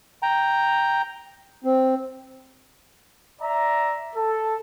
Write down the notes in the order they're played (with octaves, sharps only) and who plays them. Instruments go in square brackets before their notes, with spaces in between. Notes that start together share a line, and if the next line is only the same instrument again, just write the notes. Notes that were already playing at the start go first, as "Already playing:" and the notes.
[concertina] G5 A#5
[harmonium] C4
[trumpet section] D5 E5 A#5
A4